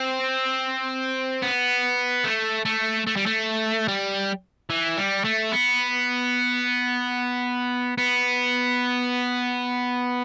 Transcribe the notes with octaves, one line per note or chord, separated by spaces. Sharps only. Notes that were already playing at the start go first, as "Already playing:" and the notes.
Already playing: C4
B3
A3
A3
A3
G3
A3
G3
E3
G3
A3
B3
B3